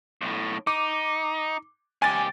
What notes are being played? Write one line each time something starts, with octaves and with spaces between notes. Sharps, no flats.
B1 A2
D#4 D6
C#2 G4 G#5 A6